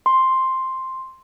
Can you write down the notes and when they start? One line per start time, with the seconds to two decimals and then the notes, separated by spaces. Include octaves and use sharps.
0.06 C6